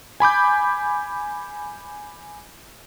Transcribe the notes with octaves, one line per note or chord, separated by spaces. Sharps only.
G#5 B5 D6 G6